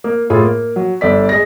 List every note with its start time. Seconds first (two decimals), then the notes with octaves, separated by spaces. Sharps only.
0.04 A#3
0.30 A2 F4 G#4 A4
0.42 A#3
0.76 F#3
1.01 G1 A4 D5 B6
1.29 G#3 A#6